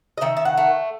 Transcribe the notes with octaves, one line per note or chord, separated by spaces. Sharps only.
D#5
D#3 E5
E5
F#5
A3